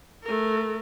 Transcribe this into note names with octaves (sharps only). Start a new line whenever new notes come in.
A3 A#4